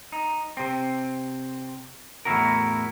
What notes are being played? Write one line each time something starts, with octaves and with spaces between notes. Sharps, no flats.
D#4
C3 C4
E2 A2 D#3 E4 F#4 A#4